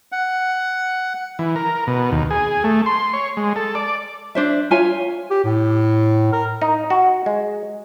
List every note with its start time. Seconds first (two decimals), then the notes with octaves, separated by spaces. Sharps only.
0.12 F#5
1.39 E3
1.56 A#4
1.87 B2
2.12 D#2
2.31 G#4
2.64 A3
2.86 C6
3.13 C#5
3.37 G#3
3.56 A4
3.75 D5
4.35 D4 C5 E5
4.71 F4 C#5 E5 G#5
5.31 G4
5.44 A2
6.33 A#4
6.62 D#4
6.90 F#4
7.26 G#3